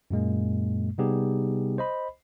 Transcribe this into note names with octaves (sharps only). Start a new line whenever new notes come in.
F#2 A#2 G#3 A#3
C3 G3 B3 D#4 G4 G#4
C5 D#5 B5